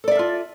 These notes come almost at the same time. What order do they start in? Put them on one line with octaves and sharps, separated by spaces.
A4 D5 E5 A5 F4